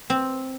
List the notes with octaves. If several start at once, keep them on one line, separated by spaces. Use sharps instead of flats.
C4